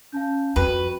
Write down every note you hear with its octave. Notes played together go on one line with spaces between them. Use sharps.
C#4 F5 A5 G6
F2 F#4 B4 G5 B5